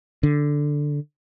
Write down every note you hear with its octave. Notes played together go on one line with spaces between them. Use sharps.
D3